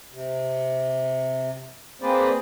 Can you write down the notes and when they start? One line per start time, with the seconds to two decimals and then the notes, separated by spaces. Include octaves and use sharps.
0.12 C3
2.02 A#3 C4 G#4 B4 C5 D5